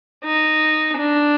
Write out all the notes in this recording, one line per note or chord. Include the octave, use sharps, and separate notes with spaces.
D#4
D4